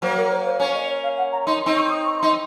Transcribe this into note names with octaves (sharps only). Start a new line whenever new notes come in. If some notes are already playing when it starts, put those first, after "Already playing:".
F#3 A#3 C5
A#4
C5
C5
A#3 C#4 C#5
D#5
C#5
F5
F#5
A#5
D#4 C6
C6
C4 D#4
C#6
D#6
C#6
D#4 C6